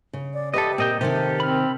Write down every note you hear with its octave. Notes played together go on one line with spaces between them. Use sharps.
C#3
D5
G4 A4 B4 D#5 E5
A#2 C4 D#5 G5
C3 D#3 G4 A4 A#4 G#5
C4 B5 F6